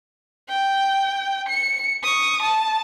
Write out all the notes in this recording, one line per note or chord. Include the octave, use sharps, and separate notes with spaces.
G5
C#7
C#6 D#6
A5